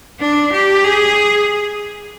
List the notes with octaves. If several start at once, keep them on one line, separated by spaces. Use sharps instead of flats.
D4
G4
G#4